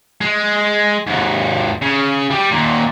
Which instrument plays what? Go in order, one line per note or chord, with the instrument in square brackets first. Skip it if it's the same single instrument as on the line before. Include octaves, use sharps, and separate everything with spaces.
[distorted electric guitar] G#3
D#2 G#2
C#3
G3 G4
D#2 A#2